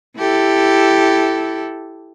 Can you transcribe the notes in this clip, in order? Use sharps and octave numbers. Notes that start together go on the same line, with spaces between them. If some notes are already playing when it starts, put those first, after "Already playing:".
E4 G4 A4